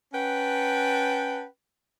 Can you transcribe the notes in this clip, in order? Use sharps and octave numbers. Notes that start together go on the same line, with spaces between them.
C#4 B4 F#5 G5 A5